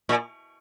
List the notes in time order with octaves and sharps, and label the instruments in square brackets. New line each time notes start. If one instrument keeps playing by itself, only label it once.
[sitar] A#2